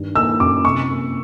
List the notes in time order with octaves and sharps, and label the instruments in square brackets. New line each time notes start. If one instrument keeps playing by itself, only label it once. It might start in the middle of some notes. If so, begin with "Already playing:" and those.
Already playing: [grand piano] G2 D#3
[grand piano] A#3 [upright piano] E6
[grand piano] F#2 [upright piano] D6
[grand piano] C3 [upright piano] C#6
[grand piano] A#3